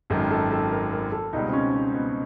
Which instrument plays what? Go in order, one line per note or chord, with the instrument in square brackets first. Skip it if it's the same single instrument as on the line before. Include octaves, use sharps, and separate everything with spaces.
[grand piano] G#1 F#2 D#3 [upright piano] A4
[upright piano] A4
A4
A#4
A#4
A4
[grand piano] C#2 B2 G3 [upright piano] D#4
[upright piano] C4
C#4
C4
B3